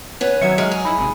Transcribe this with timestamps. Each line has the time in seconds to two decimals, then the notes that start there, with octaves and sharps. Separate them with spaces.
0.21 B3 C#4 B4
0.41 D#3 F#3 E5 G#6 C#7
0.58 G#3 F6
0.71 G#4
0.85 D#4 E4 B5
0.97 G#1 C3